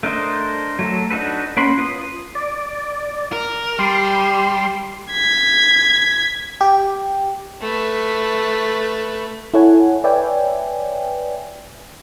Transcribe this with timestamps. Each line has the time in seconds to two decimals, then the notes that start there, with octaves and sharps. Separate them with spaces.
0.03 A3 D4 A#4 C5 D#5
0.79 F#3 A3 A4
1.10 D4 D#4 F#4 A4 B4
1.57 A#3 C#4 F#4 B5 C6
1.78 F4 B4 D#6
2.35 D5
3.33 A#4
3.79 G3 G4 C6
5.13 G#6 B6
6.61 G4
7.61 A3 B4
9.54 E4 A4 C#5 F#5 G#5
10.04 B4 C#5 D5 E5 G5 G#5